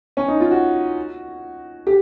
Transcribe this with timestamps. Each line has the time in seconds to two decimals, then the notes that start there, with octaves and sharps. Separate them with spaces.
0.17 C#4
0.28 D#4
0.40 F4
0.51 F#4
1.87 G4